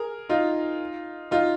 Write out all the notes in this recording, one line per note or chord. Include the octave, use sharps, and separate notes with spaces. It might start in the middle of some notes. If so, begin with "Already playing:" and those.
Already playing: G#4 A#4
D#4 F4
D#4 F4